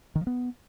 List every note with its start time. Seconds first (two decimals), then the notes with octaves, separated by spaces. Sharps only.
0.15 D#3
0.21 F3
0.27 B3